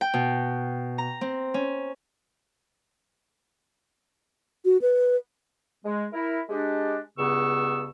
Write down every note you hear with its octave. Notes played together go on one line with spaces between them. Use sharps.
G5
B2
A#5
C4
C#4
F#4
B4
G#3
E4 A#4
G#3 D4 G4
C#2 G2 C#3 B3 C#6 E6